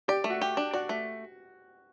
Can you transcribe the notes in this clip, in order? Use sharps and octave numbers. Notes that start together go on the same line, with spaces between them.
G4 D5
A3
F#4
G4
D4
F#4 D5
A3